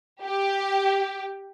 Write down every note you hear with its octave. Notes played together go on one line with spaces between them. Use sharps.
G4